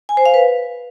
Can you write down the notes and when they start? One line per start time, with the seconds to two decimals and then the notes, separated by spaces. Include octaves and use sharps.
0.09 G#5
0.17 C5
0.26 F5
0.34 B4